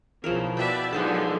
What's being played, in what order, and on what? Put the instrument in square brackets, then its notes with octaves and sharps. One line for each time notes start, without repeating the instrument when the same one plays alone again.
[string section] B1 C#3 [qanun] F3 E4 A#4
[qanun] B2 G5 [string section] B4 D5 E5
[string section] D3 F3 F#3 [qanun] G#3 D#4 A4